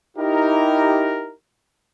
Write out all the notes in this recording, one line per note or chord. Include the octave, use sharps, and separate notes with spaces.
D#4 E4 G4 A#4